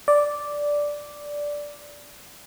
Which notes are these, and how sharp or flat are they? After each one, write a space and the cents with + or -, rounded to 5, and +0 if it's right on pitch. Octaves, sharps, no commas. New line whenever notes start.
D5 -5